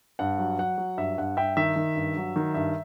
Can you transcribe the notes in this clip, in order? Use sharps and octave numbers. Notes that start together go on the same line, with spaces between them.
G2 F#5
F#3
F#3 F#5
F#3
G2 E5
G2 F#5
G2 E5 G5
D#3 E5
D#3
G2
F#3
D#3
G2 E5